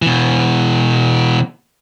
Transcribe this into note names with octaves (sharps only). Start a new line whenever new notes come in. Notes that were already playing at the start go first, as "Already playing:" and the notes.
B2 E3